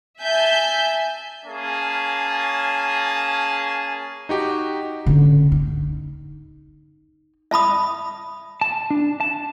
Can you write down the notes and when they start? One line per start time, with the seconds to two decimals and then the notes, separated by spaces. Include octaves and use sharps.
0.21 E5 G#5 A5 G6
1.46 A#3 C#4 G#4 A5
4.29 D#4 F#4 G4
5.06 D3 C#4
5.52 D#4
7.51 E5 A5 B5 D#6
8.61 A5
8.90 D4
9.20 A5